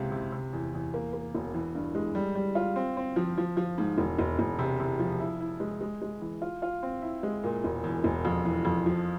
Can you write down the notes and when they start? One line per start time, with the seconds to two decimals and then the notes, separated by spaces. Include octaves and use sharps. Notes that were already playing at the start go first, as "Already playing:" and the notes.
Already playing: C#2 C3
0.12 C3
0.32 C3
0.53 E2
0.74 E2
0.94 A#3
1.13 A#3
1.35 E1
1.54 E3
1.75 G2
1.95 G#3
2.15 G3
2.35 G3
2.55 F4
2.76 C4
2.97 C4
3.16 F3
3.38 F3
3.57 F3
3.78 G#2
3.98 E1
4.19 E1
4.39 E1
4.59 C3
4.80 C3
4.99 F3
5.20 E4
5.40 E4
5.60 G#3
5.81 G#3
6.02 G#3
6.21 E3
6.42 F4
6.62 F4
6.83 C4
7.02 E4
7.23 G#3
7.44 A#2
7.64 E1
7.84 E2
8.04 E1
8.25 F2
8.45 E3
8.65 F2
8.86 F3